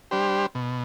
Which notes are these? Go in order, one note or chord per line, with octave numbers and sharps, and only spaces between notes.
G3 D4 G4 C5
B2